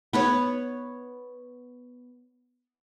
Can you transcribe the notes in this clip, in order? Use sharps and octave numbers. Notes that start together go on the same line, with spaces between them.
B3 B4 C#5